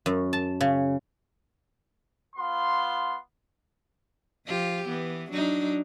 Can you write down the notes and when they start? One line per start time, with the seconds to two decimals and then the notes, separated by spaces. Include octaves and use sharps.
0.06 F#2
0.33 A5
0.61 C#3
2.36 B3 F4 C6
4.46 F3 F4 G4
4.87 E3 B3
5.31 F#3 D4 D#4